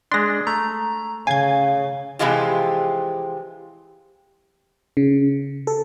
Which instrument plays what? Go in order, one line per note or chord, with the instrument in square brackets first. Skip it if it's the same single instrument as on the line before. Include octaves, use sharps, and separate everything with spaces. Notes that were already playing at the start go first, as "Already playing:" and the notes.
[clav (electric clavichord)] G#3 D4 [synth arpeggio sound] C6 A#6
[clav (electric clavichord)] A3 [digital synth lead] A#5
[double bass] C#3 [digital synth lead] F5 [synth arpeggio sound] G#5 G#6
[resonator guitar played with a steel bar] C3 E3 F3 G#3 F4 G4
[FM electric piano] C#3
A4